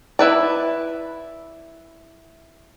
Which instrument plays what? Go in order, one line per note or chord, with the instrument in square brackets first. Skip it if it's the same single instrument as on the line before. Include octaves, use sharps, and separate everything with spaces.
[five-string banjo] E4 B4 D5